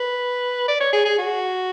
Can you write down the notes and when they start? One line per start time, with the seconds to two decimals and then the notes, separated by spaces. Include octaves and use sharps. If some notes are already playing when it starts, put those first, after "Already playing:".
Already playing: B4
0.68 D5
0.81 C#5
0.93 G#4
1.05 G#4
1.18 F#4